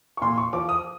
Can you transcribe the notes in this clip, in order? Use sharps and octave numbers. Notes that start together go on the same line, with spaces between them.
C#6
A#2 C6
C#6
F3 D6
D#6